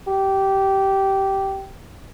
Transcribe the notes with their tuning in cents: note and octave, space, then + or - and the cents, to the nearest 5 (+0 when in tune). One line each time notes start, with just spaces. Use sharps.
G4 -15